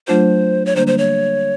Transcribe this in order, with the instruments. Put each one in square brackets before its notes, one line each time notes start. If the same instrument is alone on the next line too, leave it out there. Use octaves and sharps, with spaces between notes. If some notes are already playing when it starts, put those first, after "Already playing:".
[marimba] F#3 A3 D4 F4 [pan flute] C5
[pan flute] C#5
[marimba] D3 G3 A#3 D4 [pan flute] C5
[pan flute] C5
C#5